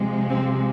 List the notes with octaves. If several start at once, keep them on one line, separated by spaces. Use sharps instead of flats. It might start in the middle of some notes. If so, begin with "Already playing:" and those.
Already playing: C3 F3 G#3
C4